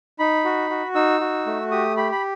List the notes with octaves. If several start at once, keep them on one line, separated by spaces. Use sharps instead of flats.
D#4 B5
F#4
F#4
D#4 E6
F#4
A3
G4 D#6
G4 B5
B5